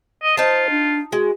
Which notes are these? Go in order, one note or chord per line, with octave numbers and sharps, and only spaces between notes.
D#5
D#4 F4 C5 A5
D4
G#3 F#4